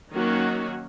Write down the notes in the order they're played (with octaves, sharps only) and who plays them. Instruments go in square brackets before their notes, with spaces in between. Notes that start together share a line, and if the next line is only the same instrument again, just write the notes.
[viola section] D#3 F#3 A#3 C#4 F#4